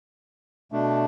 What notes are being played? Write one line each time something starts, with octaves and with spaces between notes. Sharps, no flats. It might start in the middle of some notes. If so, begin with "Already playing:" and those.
B2 A3 D4